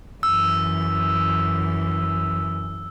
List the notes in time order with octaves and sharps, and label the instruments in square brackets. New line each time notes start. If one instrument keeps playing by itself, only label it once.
[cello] F#2 E3 [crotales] E6